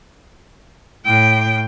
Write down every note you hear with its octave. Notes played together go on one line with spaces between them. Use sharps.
A2 G5